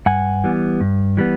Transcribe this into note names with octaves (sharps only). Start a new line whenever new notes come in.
G2 F#5 G#5
E3 G3 B3
G2
E3 G3 B3